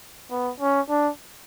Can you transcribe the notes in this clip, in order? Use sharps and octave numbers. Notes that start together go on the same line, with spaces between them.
B3
C#4
D4